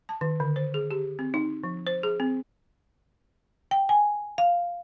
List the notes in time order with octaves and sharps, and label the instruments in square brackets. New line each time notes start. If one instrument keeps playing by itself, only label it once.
[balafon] A5
D#3
D3
C5
G#4
G4
C4
D#4
F3
C5
G#4
C4
[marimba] G5
G#5
F5